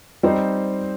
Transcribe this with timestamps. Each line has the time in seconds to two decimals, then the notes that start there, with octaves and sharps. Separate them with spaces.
0.23 G3 C4 D#4 C5